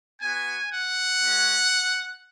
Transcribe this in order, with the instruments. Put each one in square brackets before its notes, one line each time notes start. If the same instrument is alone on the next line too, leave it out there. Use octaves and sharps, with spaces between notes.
[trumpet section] B3 F#4 G#5
F#5
G#3 C#4 F#4